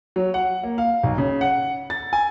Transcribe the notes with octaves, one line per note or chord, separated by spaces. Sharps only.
F#3
F#5
A#3
F5
B1
C#3
F#5
A6
G#5